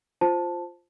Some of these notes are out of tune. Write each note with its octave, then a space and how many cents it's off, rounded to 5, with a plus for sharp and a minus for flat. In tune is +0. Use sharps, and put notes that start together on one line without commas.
F4 +0 C5 +0 A5 +0